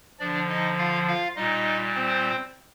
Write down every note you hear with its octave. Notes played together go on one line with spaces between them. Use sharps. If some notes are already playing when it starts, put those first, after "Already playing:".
D3 F3 D4 D5
D#4 D#5
F4 F5
F4 F5
A#2 G3 D#4 D#5
C4 C5